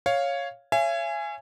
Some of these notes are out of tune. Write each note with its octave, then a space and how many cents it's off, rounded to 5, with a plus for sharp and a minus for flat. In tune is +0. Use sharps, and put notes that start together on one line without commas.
C#5 +0 F5 +0
C#5 +0 E5 +45 G#5 +0